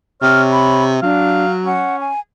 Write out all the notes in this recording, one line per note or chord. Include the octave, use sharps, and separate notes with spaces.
C3 C#5 F6
B5
F#3 D4 F5
C#4 F#5
G#5